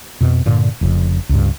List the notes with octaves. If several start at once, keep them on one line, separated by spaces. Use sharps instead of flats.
F2 B2
G2 A#2 D3
F1 F2 C#3
C#2 G2